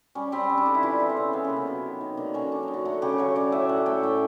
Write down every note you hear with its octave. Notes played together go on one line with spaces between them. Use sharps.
G3 C#4
G3 C4
G3
D4
D3 D#4
E4
E3 F4
E3
C4
C#3 B3
C#3 B3
A#3
C3
B3
F#3
D#3
D#3
D3 A#3
F#3 C#4
D3 D4
D#4
D3
F#4
A3 F#4
C#3 G4
F#3 C#5
C#3 D5
A2 E5
A3 F#5
A3 G5
A2